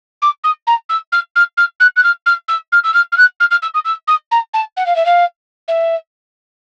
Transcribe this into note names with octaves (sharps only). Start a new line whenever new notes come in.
D6
D#6
A#5
E6
F6
F6
F6
F#6
F#6
F6
F6
E6
F6
E6
F6
F6
F#6
F6
F6
E6
D#6
E6
D#6
A#5
A5
F#5
F5
E5
F5
E5